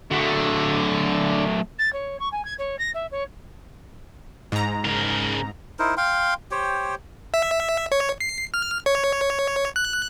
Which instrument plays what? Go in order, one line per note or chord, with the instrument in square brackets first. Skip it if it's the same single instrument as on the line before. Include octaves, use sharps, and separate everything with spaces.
[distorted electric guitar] D3 [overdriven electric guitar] F#3 A3
[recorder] A6
C#5
C#6
G#5
G#6
C#5
A#6
E5
C#5
[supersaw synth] G#2 A#5
[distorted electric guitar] C#3 A#4
[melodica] D#4 E4 A#4 C5
F5 G5 C6
G4 C5 C#5 G5
[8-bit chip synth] E5
C#5
C7
F6
C#5
F#6